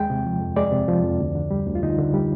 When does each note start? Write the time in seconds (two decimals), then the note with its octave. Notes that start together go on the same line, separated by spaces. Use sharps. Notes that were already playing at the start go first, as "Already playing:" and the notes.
Already playing: D#2 G#3 G5
0.10 C3
0.26 F3
0.41 F2
0.56 G#3 D5
0.72 C3
0.88 F3
1.03 F2
1.20 D2
1.35 D3
1.51 G3
1.67 D2
1.75 F4
1.83 D2 D#4
1.98 D3
2.14 G3